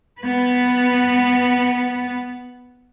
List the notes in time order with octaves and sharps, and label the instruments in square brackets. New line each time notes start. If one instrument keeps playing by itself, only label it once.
[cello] B3 B4